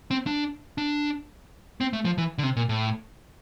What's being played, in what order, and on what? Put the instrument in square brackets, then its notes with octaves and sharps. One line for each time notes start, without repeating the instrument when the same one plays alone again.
[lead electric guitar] C4
D4
D4
C4
A3
F3
E3
D3
C3
A#2
A2